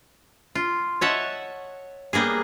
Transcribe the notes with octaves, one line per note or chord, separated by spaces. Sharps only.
F4
C#5 D#5 E5 F#5 A5
G3 A#3 B3 G#4